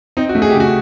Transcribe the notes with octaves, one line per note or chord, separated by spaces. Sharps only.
C4 D#4
F#4
A3
G#4
C#3 G4
F#4